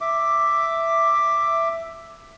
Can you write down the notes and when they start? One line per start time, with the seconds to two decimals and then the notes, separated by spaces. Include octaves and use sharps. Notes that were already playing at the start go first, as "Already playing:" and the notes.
0.01 E5 D6